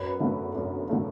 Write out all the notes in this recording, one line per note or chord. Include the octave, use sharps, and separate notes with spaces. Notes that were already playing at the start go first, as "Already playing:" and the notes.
Already playing: F#2 B4
D3 A3
F#2
D3 A3